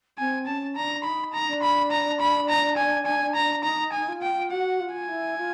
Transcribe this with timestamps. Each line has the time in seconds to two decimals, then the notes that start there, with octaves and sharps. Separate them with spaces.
0.18 C4 G#5
0.46 C#4 A5
0.76 D4 A#5
1.04 D#4 B5
1.33 A#5
1.47 D4
1.62 B5
1.91 A#5
2.20 B5
2.49 A#5
2.77 G#5
3.06 G#5
3.35 A#5
3.64 D#4 A#5
3.92 G#5
4.08 F4
4.22 G5
4.51 F#4 F#5
4.79 F4
4.94 G#5
5.08 E4
5.37 F4